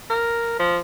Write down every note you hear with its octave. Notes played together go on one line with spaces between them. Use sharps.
A#4
F3